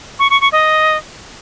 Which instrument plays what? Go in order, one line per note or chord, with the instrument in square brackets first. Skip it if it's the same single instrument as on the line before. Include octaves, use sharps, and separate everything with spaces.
[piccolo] C#6
C#6
C#6
D#5